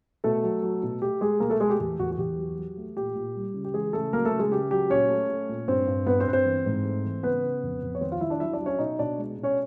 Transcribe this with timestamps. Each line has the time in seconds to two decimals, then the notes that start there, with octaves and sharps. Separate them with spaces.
0.24 B2 A3 A4
0.44 F#3
0.62 F#3
0.83 B2
1.02 A3 G4
1.21 G#3 A3 G#4
1.40 B2 A#3 A#4
1.50 A3 A4
1.60 G#3 A3 G#4
1.70 G4
1.80 E2 G4
1.99 E2 F#4
2.11 F#4
2.18 E2 G4
2.37 F#3
2.57 F#3
2.77 A3
2.97 A#2 G4
3.15 A#2
3.36 G3
3.54 C#3
3.65 G4
3.74 E3 G#3 G#4
3.93 C#3 A3 A4
4.13 F#3 A#3 A#4
4.25 A3 A4
4.32 C#3
4.39 G#3 G#4
4.51 C#3 G4
4.71 F#3 G4
4.90 A#2 C#4 C#5
5.09 A3
5.29 A3
5.49 A#2
5.68 G2 C4 C5
5.87 G2
6.06 G2 B3 B4
6.20 C4 C5
6.26 G2 B4
6.33 C4 C5
6.45 E3
6.66 G#2
6.85 A3
7.05 E3
7.23 C#3 B3 B4
7.43 C#3
7.63 F2
7.83 F2
7.95 C#5
8.01 D#3 C4 C5
8.12 F4 F5
8.21 D#3 E4 E5
8.30 D4 D5
8.40 F#3 E4 E5
8.53 D4 D5
8.59 F#3
8.66 C#4 C#5
8.79 B2 D#4 D#5
8.99 B2 D4 D5
9.18 G#3
9.38 B2
9.43 C#4 C#5